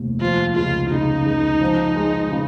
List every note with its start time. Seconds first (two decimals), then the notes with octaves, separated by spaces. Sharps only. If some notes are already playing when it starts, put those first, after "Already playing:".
Already playing: F1 D#2
0.21 F3 F4
0.56 C#2 F4
0.91 C#3 D#4
1.26 C#2
1.61 F3
1.96 G#3
2.31 C#3